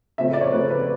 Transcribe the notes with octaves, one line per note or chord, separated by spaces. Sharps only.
C#3 F3 A3 C4 E5
D5
C#5
C#3 F3 A3 C4 B4
B4